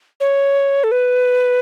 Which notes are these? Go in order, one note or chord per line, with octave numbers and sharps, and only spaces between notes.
C#5
A4
B4